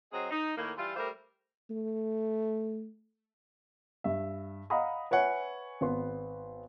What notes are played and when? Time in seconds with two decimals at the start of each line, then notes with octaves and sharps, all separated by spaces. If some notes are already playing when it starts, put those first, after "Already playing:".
0.13 F#3 C4 G#4 D#5
0.31 D#4
0.56 A2 D#3 A#3
0.78 E3 G3 F4
0.97 G3 A3 G4 A#4 C5
1.70 A3
4.04 G2 E5
4.70 D#5 F5 F#5 A#5 B5 D#6
5.11 B4 C#5 E5 F#5 G#5
5.81 G#1 B3 C6